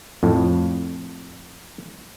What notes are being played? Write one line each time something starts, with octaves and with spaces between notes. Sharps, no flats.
F2 A2